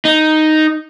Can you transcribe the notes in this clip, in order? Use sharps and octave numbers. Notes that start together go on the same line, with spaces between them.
D#4